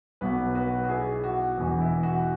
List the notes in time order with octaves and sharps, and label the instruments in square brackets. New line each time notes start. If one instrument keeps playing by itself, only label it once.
[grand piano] B1 B2 F#4 B4
F#4 B4
F#4
E4 G#4
F#4
E1 E2 E3 F#4
E4
F#4